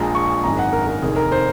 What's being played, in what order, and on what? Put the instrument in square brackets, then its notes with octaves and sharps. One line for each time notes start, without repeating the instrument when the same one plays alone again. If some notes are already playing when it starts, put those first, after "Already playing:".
Already playing: [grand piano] A#1 A#2 G#3 A#5
C#6
G#1 F#2 D#3 G#3 A#5
F#5
A#4
A#4
F1 D#2 D#3 G#4
A#4
C5